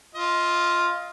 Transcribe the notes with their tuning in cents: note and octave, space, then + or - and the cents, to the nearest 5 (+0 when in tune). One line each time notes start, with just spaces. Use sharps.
F4 +0 D#5 +25